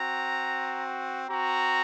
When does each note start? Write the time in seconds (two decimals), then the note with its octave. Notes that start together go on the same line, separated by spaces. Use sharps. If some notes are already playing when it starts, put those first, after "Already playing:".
Already playing: C4 F#4 A#5
1.30 C4 F#4 A#5